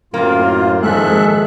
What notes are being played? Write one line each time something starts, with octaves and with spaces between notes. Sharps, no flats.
F#2 A2 A#3 C4 F4
F2 G#2 D#3 G#3 G#4 A4 E5 F#6